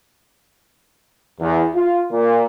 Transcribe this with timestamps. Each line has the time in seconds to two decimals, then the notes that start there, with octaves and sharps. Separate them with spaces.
1.40 E2
1.76 F4
2.12 A#2